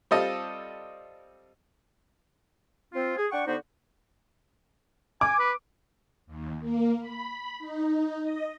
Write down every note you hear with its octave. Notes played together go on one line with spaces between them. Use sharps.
G3 C4 F4 A4 D#5
C4 F4
G#4
D4 F#5 G5 C#6
D3 B3 D#4 F#4 G4 C5
G#5 D6
B4
D#2
A#3
B5
D#4
D#5